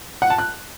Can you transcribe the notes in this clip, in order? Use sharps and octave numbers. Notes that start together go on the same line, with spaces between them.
F#5
A5
F#6